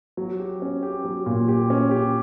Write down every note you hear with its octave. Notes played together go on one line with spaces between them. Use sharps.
F#3
G4
C#4
G4
F#3
A#2
G4
C#4
G4